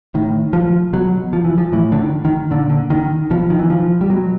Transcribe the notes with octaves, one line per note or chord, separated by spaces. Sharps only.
A2 D#3
F3
B2 F#3
F3
E3
F3
A2 E3
D3
D#3
D#3
A#2 D3
D3
D#3
B2 F3
D#3
E3
F3
G3
B2 F#3